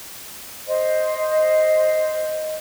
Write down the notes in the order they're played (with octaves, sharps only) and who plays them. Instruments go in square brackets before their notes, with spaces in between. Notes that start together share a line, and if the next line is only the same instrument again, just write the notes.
[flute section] C5 D#5